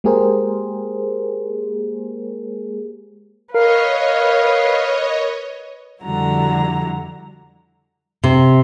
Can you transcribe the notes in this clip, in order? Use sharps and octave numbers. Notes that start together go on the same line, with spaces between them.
G#3 A#3 G4 G#4 A#4 C5
A#4 B4 C#5 D#5 F5
F2 D3 G3 E4 F#4 A#5
C3